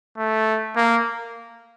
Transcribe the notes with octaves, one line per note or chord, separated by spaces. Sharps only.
A3
A#3